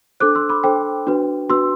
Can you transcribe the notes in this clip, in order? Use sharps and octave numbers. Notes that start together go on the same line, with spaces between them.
D4 A4 C5 D6 F#6
C6 E6
B5 D6
D4 A4 C5 G5
D4 F#4 B4
D4 F#4 B4 C6 E6